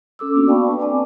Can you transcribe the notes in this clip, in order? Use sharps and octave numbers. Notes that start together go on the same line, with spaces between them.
C#4 A4 D6 E6
A#3 B3 D4 F#4
D5 F5 G5 A5 B5 C#6
B4 D6
C4 D5 G#5 A5 D6